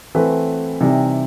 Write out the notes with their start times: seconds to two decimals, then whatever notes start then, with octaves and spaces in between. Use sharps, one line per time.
0.15 E3 A3 C4 F#4 B4
0.80 C3 E3 G3 D#4